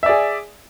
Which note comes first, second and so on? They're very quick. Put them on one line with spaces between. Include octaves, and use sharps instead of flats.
E5 D5 G#4